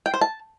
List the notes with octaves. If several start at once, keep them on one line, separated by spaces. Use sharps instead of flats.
G5
C5
A5